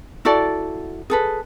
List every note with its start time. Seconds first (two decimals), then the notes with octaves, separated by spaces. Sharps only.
0.25 E4 F#4 A4 D5
1.10 G#4 A4 B4